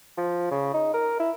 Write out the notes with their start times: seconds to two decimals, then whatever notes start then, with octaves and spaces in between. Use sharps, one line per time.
0.18 F3
0.51 C#3
0.74 D#4
0.93 A#4
1.20 E4